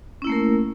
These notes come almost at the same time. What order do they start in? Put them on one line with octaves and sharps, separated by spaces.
C#4 E4 A#3 A3 A#4